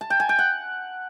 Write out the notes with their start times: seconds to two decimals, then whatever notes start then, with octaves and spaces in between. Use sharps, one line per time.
0.01 A5
0.10 G5
0.20 G#5
0.29 G5
0.39 F#5